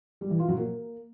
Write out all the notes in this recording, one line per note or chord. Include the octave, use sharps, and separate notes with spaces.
G3
E3
F4
F#3
A#3